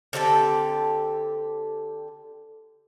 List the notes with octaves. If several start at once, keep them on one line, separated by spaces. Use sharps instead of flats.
D3 C4 G4 A4